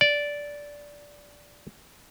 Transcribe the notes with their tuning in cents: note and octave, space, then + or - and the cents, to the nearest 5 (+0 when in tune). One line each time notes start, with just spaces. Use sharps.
D5 -10